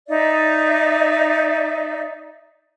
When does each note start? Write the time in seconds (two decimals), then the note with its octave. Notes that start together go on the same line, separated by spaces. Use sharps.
0.08 D#4 D5 E5